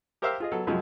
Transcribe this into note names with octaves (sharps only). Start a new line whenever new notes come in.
G4 A#4 C5 E5 F5
F4 G#4 D#5
F#3 B3 A4
C2 F#2 F3 F#3 G#3